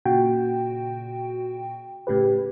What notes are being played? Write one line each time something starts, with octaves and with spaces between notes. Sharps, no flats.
A#2 C#3 F#4 G5
A2 C#3 G4 B4